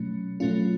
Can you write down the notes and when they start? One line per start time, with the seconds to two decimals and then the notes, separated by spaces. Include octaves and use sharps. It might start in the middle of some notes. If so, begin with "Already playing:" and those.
Already playing: B2 F#3 A3 C#4
0.40 B2 F#3 A3 C#4 F4